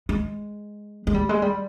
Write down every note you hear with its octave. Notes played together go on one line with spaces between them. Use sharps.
G#3
G#3
G3
G#3
G3